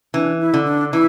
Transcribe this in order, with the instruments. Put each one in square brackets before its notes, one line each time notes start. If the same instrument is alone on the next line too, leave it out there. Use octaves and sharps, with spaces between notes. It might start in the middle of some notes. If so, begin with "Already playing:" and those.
[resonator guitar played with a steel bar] E3 [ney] D4
[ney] E4
[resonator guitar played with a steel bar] D3
[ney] D4
[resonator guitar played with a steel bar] E3 [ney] E4